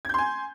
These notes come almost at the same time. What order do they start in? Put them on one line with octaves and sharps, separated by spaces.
G#6 G6 C6 G#5